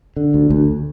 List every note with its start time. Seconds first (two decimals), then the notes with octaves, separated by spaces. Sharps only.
0.16 D3
0.34 D2
0.50 D2